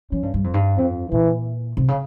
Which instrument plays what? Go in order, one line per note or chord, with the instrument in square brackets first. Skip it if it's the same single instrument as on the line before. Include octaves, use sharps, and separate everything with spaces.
[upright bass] F3 [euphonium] C#4
[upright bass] G2
G2
F2
G2
[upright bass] F2 [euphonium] C4
[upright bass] A#2 [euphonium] E3
[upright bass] C3
C#3